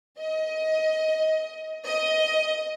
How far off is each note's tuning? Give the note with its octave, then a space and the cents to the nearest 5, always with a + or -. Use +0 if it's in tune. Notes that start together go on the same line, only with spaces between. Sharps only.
D#5 +20
D#5 +15